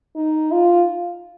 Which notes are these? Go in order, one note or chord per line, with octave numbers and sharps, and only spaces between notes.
D#4
F4